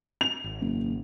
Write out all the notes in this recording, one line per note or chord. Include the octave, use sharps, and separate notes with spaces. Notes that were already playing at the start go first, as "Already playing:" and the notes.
F7
G#1
F#1